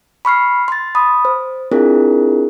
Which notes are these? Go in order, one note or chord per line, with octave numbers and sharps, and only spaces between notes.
B5 C#6 F6 C7
C6 A6
B5 D#6
C5
C4 D4 E4 F4 G#4 A#4